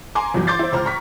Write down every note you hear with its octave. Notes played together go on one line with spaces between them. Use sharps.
G#5 A#5 C6 D6
G1 E2 F#3
C6 D6 G6 A6 C7
E4 C5
C#2 C5 A#5 F6
A#5 C#6 B6